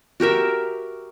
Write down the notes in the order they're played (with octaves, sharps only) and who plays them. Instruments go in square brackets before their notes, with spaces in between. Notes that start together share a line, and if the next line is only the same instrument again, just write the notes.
[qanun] F#4 G4 A#4 E5